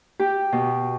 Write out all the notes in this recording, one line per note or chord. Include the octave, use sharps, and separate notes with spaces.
G4
B2